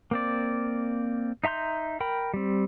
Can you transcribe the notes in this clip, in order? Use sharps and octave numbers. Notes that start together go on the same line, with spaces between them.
A#3 C4 D5
D#4 E5 A#5 C6 G6
A#4 G5 B5
G3 C4